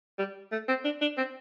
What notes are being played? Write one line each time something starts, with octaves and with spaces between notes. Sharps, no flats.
G3
A3
C4
D4
D4
C4